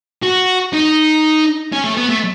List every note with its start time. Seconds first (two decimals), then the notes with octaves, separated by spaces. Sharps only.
0.22 F#4
0.73 D#4
1.73 C#4
1.84 A3
1.97 B3
2.09 A3